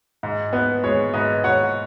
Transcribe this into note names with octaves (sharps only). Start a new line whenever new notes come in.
G#2
B3 B4
G#3 C#5
G#2 B4 D#5
G#2 C#5 F#5